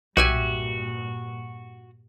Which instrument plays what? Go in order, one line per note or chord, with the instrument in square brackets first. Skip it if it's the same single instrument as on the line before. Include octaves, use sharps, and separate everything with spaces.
[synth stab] B1 [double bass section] G2 A#2 [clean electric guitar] F#4 [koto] G4 E5 G#5